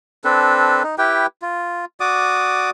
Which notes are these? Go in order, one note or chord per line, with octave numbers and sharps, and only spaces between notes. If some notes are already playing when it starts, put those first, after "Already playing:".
C4 D4 A4 B4
D#4
E4 G4 B4 G5
F4
F#4 D5 D6 D#6